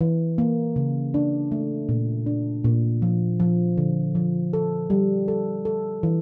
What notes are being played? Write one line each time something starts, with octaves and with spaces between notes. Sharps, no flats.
E3
A#3
C#3
D4
A3
A#2
D4
A#2
F3
F3
D3
F3
A4
G3
A4
A4
E3